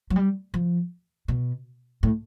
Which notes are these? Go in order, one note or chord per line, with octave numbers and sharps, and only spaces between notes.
F#3
G3
F3
B2
A2